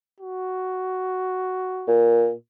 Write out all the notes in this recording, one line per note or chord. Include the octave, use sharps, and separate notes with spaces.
F#4
A#2